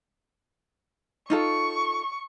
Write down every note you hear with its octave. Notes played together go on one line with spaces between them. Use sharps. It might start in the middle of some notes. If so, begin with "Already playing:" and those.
D#4 F4 A4 C#6